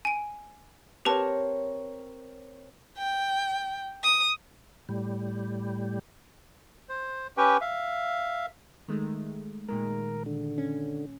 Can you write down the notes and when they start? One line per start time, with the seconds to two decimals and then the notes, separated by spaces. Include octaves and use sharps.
0.05 G#5 D7
1.05 C4 G4 A#4 B4 C#5 A5
2.98 G5
4.04 D#6
4.89 A2 G3
6.89 C5
7.37 C#4 G4 B4 G5
7.61 E5 F5
8.88 D#3 G#3 A3
9.69 A#2 D#3 G#3 A#4
10.26 D3
10.58 C#4